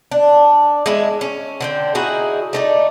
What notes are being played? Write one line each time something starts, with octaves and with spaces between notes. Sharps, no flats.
D4
G#3 E4
C#4
D3 C4 G5
D#4 E4 F#4 G#4
A3 D#4 D5